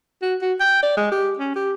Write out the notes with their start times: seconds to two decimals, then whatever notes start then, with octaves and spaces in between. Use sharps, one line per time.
0.22 F#4
0.42 F#4
0.60 G5
0.83 D5
0.97 G#3
1.12 G4
1.39 C#4
1.55 G4